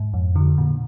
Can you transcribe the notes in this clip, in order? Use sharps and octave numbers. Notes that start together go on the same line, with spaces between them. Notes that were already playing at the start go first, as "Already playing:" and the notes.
Already playing: G#2
F2
D3
A#2